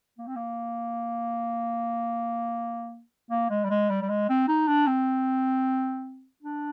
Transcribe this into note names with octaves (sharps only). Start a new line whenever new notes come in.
A#3
C4
A#3
A#3
G#3
G3
G#3
G3
G3
G#3
C4
D#4
D4
C4
D4